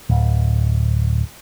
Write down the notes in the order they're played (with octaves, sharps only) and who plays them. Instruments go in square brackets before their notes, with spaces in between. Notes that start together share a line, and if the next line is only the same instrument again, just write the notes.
[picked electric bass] D1